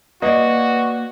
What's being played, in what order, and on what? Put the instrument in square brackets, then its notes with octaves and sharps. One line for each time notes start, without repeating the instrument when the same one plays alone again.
[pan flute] A#3 [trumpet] F#4 [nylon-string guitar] B4 D5 [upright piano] D#5